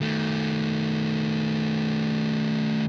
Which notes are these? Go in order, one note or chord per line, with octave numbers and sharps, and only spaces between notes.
D#3 A3